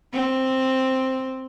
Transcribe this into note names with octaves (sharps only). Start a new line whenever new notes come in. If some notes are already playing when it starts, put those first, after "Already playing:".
C4